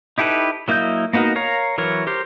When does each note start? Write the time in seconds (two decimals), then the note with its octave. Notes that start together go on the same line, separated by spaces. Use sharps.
0.18 D#4 E4 G4 A4 B4
0.68 F#3 A#3 E4 D#5 G6
1.13 A#3 B3 D#4 F#4 A#4
1.36 A#4 C#5 F5 A#5
1.78 E3 F#3 A#4 C#5
2.07 G4 A#4 C5